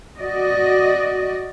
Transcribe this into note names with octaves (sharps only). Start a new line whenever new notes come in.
F#4 D5 D#5